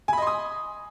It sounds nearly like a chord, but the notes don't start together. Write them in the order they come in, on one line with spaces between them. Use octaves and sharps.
G#5 B5 D#5 C6 D#6